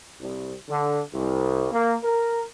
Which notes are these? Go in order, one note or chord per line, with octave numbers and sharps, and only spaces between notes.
C2
D3
C2
A#3
A#4